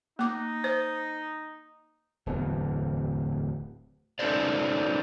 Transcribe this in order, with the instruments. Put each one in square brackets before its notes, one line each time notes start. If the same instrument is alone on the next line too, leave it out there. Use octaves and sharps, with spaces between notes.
[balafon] A#3 D6 [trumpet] D#4
[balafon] C5
[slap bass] D1 E2 B3
[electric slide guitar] C#4 D#4 A4 B4 C5 D5